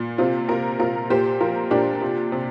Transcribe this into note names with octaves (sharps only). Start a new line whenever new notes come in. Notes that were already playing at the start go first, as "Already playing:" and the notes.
Already playing: A#2
C3 C4 F4
C3 F4 A#4
C3 F4 A#4
A#2 G4 C5
F3 F4 A#4
A#2 D4 G4
C3
C3